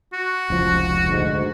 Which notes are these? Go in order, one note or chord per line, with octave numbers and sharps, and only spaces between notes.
F#4
F1 C#2 F3
D2 G#2